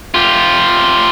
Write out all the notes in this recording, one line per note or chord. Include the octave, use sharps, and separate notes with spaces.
F4 G4